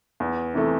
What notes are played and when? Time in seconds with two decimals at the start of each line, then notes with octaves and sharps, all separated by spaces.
0.20 E2
0.54 C3 E3 A3